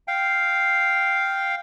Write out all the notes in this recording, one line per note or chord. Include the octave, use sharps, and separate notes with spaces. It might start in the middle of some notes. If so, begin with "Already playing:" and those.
F5 G5